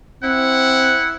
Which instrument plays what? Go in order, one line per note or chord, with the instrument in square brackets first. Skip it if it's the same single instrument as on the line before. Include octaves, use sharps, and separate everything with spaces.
[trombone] C4 [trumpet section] E4 F#5